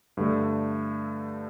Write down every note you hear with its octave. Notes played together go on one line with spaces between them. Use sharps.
G2 D3 A3